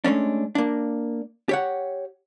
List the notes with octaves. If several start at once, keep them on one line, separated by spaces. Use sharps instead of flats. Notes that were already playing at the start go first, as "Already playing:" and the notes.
G#3 A3 C#4 D4
A#3 D4
G4 C#5 F#5